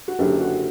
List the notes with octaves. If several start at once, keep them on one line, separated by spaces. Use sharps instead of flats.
F#4
F#1 F#2 D3 F#3 G4
F#4